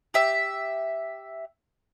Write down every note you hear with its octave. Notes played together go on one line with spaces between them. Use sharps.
G4 E5